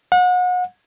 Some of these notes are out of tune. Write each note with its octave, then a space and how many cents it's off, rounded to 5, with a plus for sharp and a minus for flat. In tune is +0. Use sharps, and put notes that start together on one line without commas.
F#5 -35